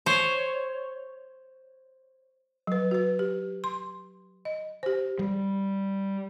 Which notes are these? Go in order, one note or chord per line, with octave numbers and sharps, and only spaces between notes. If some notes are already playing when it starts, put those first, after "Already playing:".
C5 C#5
F#3 B4
F#4 B4
G4
C6
D#5
G4 C5
G3